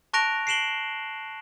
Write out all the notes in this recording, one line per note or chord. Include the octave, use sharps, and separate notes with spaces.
A5 C#6 F#6 A#6 D7 F7
C7 D7 E7 F#7 G7